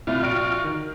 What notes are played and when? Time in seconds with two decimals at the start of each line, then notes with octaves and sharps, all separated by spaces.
0.07 C2 A3 F4
0.23 A#1 F#4 F6 D7
0.64 D#3